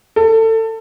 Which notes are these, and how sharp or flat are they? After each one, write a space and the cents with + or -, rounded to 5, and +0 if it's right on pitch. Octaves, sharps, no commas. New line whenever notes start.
A4 +25